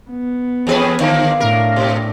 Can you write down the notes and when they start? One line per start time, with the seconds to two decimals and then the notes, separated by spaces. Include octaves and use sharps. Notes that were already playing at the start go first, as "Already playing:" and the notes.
0.10 B3
0.67 E2 G#4 B4 C#5
1.00 D3 F3 A#3 F5
1.40 A2 D4 A#4
1.76 B2